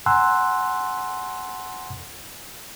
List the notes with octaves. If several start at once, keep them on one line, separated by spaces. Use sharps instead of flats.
F#5 G#5 A#5 C6 E6 F#6